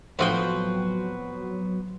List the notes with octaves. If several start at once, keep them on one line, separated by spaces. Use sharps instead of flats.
A2 F3 F#3 B3 C4 F#4 G5